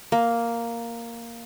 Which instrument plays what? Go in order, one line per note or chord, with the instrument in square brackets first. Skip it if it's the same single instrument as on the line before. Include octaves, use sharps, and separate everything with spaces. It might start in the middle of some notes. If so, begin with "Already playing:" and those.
[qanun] A#3